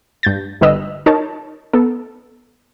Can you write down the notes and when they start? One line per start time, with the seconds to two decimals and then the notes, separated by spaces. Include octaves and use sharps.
0.23 G2 G6 A6
0.61 G1 D3 G3 B4 D#5 E6
1.06 D#4 A#4 C#5 A5
1.73 B3 A4